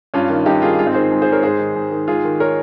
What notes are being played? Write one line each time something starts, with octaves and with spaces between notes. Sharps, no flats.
G2 C#4 F4
D#3
G2 D#4 G4
D#3 F4 G#4
G#2 F4 G#4
C4 D#4
D#3 G#4 C5
G#2
G#4 C5
D#3
A#4 C#5
G#2 G#4 C5
D#3
G#2
D#3
G#2 F4 G#4
D#3
A#4 C#5